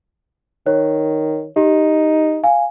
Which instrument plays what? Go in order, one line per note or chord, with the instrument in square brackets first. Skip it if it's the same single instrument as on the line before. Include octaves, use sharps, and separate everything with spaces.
[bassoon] D#3 [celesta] C#5
[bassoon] D#4 [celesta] G4
[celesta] F5 G#5